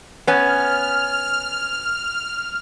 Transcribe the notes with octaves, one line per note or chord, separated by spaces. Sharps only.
B3 C#4 F6